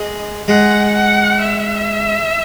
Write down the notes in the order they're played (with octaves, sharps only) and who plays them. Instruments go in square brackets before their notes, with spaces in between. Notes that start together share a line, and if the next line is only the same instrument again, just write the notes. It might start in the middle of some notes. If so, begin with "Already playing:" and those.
Already playing: [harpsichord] G#3 [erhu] D#5
[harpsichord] G#3 [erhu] F#5
[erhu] F#5
E5